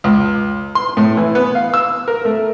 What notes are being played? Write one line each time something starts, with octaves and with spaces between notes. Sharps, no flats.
C#2
C6
A2
E3
B3
F5
E6
A#4
A3